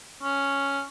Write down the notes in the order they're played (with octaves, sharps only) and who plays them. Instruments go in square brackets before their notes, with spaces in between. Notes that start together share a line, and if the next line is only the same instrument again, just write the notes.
[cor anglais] C#4